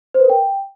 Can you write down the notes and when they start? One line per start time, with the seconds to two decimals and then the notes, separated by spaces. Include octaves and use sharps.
0.14 C5
0.19 B4
0.25 A#4
0.30 G5